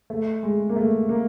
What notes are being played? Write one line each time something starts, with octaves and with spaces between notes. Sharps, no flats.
A3
G#3
A#3
A3
A#3